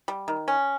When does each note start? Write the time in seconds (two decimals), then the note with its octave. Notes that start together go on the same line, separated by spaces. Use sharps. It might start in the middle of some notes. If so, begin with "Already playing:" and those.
0.08 G3
0.28 D#3
0.48 C#4